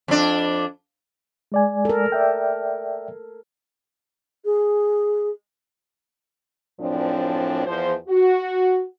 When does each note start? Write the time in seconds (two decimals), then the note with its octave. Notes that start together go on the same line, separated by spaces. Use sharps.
0.08 F2 D4
1.52 G#3 D5 G#5
1.85 A4 A#4
2.12 D5 E5 G5
4.45 G#4
6.80 F#2 A2 F3 C4 D4
7.67 E2 F3 C5
8.08 F#4